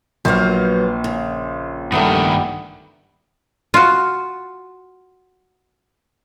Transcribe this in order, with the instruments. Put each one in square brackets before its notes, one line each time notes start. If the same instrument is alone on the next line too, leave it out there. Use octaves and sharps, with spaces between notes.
[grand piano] A#1 [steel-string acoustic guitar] F#3 A#3 B3 [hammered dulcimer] C5 F5
[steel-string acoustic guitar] C#3
[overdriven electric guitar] G2 D#3 [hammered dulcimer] G3 A3 B3
[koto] F4 F#4